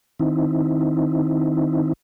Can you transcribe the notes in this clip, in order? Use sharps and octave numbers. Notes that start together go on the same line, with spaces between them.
D#3 C4 D#4 E4